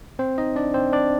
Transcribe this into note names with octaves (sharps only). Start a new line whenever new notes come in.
C4 C5
D#4 D#5
D4 D5
C4 C5
D4 D5